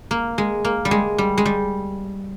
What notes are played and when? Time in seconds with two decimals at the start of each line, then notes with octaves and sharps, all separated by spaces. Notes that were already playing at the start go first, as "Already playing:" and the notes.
0.11 A#3
0.38 G#3
0.65 A#3
0.85 G3
0.91 G#3
1.18 G3
1.38 G#3
1.45 G3